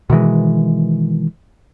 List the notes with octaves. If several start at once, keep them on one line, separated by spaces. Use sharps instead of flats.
B2 D#3 E3 G#3